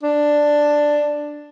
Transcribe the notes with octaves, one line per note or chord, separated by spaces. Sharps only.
D4